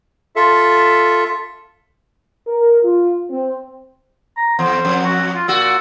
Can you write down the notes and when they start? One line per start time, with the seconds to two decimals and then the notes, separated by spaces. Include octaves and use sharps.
0.36 F4 A4 E5
2.48 A#4
2.83 F4
3.30 C4
4.37 A#5
4.59 E2 C5
4.85 F2
5.04 F#4
5.35 F4
5.48 A#2 F#4 E6